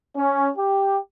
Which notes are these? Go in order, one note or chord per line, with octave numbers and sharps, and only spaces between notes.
C#4
G4